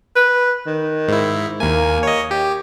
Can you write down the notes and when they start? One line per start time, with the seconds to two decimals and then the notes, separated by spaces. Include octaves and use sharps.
0.16 B4
0.66 D#3
1.08 G#2 E4
1.60 D#2 A#3 G#5
2.03 C#5 D#5
2.31 G4